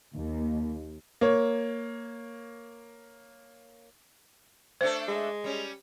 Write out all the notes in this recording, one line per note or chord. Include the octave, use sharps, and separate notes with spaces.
D#2
A#3 C#5
A3 D4 A4 C5
G#3
G3 C#4